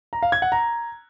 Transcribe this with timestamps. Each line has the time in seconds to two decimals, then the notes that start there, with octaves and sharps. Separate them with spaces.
0.13 A#5
0.23 F5
0.32 G#6
0.42 F#5
0.52 A#5